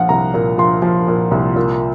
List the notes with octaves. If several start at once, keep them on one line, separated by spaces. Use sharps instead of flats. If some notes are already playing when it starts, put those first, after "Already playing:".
Already playing: A#2 F3 F5 F#5
C2 A#5
A#2
F3 C6
F3
A#2
C2
A#2